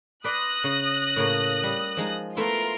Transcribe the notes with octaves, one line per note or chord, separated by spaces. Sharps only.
B4 D5 C6 D#6 F#6 A#6
C#3
A2 C#3 A#3
G3
F3 G#3 D#4
A3 B3 E4 F4 A#4 C6